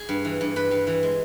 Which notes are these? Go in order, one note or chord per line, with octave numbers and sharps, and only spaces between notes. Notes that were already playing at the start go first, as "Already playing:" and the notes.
Already playing: G#4
G2
E3
G2
G2 B4
G2
E3
G#3